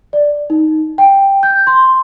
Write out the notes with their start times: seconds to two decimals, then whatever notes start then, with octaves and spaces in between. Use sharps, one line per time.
0.13 D5
0.50 D#4
0.98 G5
1.43 G6
1.67 C6